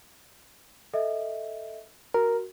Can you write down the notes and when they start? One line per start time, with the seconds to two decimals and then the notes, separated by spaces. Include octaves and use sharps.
0.93 A4 D#5 E5
2.14 F#4 A#4